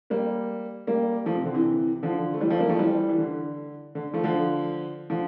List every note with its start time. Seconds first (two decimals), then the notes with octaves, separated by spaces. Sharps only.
0.10 G3 A#3
0.87 G3 A#3
1.26 F3 A3
1.35 C3
1.45 D3
1.54 C3 E3
2.03 D3 F3
2.34 A3
2.41 E3 G3
2.50 F3 A3
2.60 G3 A#3
2.69 F3 A3
2.79 E3 G3
3.09 E3
3.18 D3
3.95 D3
4.13 F3 A3
4.24 D3 F3
5.10 D3 F3